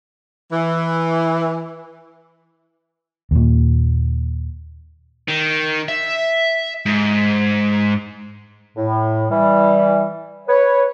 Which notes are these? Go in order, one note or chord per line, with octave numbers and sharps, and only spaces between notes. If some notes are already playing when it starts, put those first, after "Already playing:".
E3
D#2 A#2
D#3
E5
G#2
A2
E3 G3
B4 C#5